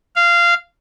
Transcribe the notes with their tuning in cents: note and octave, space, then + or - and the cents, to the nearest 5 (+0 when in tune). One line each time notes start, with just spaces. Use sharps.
F5 -15